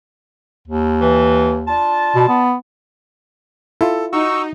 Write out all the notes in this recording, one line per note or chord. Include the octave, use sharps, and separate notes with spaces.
D#2
E3
D4 F4 A5
B2
B3
E4 F4 A4
D#4 F#4 C#6 E6